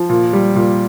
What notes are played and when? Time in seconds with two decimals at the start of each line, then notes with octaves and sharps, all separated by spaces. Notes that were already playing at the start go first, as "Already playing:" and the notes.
Already playing: F3
0.10 A#2
0.33 G3
0.56 A#2